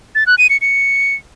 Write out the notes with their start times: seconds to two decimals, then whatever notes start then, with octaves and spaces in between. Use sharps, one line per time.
0.15 A6
0.27 F#6
0.38 D#7
0.50 C#7
0.61 C#7